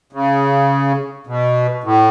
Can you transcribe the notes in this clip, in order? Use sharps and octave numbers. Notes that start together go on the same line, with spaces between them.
C#3
B2
A2